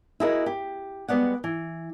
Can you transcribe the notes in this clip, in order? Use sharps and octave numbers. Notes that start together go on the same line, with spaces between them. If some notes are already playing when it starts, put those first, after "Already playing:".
E4 F#4 G#4 A#4 D#5
G4
G3 G#3 B3 D5 F#5
E3